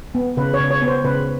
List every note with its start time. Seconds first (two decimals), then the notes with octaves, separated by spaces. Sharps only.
0.15 B3
0.37 C#3 B4
0.54 C#5
0.60 C#3
0.71 C#5
0.82 B3
0.88 C5
1.04 C#3 B4